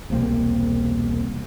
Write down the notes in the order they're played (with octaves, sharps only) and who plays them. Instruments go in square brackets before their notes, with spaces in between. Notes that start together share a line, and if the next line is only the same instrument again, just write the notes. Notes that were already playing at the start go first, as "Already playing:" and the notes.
[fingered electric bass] E1 C2 A#3 C4